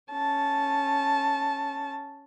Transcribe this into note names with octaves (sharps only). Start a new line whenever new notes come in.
C#4 A5